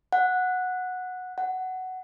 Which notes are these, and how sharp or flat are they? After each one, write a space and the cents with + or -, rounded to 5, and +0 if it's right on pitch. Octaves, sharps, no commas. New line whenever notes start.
F#5 -10
F#5 +10